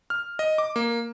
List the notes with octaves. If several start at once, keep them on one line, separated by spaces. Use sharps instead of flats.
F6
D#5
D6
A#3